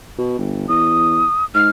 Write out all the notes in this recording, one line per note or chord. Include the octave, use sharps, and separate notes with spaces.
B2
G1
E2 D#6
G#2 F6